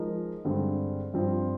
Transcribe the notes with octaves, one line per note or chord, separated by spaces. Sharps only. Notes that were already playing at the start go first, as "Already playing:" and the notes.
Already playing: F3 G#3 D#4 A#4
G2 D3 G#3 C4
G2 F3 C4 F4